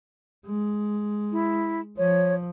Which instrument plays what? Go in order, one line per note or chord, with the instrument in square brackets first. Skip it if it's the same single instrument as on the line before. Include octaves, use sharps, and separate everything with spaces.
[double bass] G#3
[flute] E4
[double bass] F3 [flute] C#5